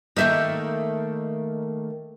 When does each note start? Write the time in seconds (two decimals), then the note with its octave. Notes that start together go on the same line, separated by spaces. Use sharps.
0.16 D#3 A3 A#3 D#4 E5 G6